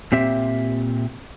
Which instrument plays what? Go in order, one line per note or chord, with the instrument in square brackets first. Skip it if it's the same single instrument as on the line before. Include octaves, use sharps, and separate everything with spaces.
[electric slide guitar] A#2 C4 G4 E5